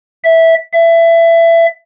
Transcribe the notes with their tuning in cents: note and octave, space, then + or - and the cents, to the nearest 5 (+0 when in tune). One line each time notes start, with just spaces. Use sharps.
E5 -10
E5 +20